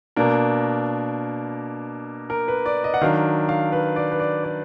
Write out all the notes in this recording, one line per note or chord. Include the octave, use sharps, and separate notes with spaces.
B2 A#3 D4 A#4
A#4
B4
D5
D#5
F#5
D#3 F#3 D4 F5
F5
B4
D5
B4
D5
D5